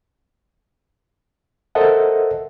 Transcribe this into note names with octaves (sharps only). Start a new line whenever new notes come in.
A4 A#4 C5 D#5 E5 F#5